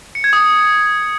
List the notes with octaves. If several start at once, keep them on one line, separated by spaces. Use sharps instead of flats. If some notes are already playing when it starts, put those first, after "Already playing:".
C#7
G#6
D#6